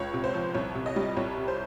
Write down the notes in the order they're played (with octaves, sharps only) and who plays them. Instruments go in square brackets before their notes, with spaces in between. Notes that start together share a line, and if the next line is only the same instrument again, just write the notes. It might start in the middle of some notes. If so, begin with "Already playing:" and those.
Already playing: [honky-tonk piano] C#2 C#5
C3
C5
F3
C2 C#5
C3
D#5
G3
C2 C#5
C3
C5